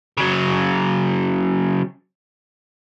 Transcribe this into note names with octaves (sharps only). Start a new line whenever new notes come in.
C#3 F#3